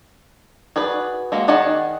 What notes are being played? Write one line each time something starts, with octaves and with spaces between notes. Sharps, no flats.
F#4 G#4 B4 D5
G#3 A#3 F#4
D#3 D#4 G#4 D5 F#5